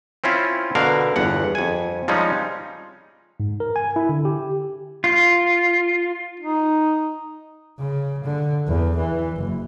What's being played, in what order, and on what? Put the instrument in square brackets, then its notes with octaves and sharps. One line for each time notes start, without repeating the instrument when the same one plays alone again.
[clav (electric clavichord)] C4 C#4 E4 F4
B2 D3 A#4 F5
G1 E2 F#5
F2 G#5
F3 G3 G#3 C4 C#4 D#4
[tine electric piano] G#2
A#4
G#5
E4
D3
G4
[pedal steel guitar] F4
[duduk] D#4
[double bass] C#3
D3
E2
E3
F#1